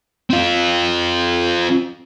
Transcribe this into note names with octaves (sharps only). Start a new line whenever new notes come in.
C4 F4